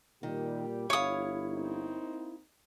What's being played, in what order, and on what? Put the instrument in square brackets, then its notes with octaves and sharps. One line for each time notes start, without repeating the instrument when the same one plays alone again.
[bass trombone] A#2 [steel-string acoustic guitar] D#3 [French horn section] G3 G4
[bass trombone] G1 [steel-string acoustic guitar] E4 F5 [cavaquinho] C#5 D#6
[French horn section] A#3 C4 D#4